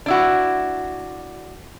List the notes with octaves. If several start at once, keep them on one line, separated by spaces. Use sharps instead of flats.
D4 E4 F#4